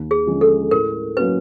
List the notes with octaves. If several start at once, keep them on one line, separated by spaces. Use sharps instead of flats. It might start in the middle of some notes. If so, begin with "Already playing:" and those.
Already playing: D#2
G#4
D3 F3 G#3 C#4
A4
A2 A#4
F#3 A#3 C#4 F#4 B4